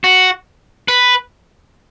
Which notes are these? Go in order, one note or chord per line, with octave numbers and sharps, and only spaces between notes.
F#4
B4